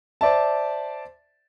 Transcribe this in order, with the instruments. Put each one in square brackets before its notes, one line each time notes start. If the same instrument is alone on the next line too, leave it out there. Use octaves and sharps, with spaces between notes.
[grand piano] C5 D5 E5 A5